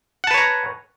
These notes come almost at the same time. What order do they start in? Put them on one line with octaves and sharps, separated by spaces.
F#5 A5 B4 C#5 A#5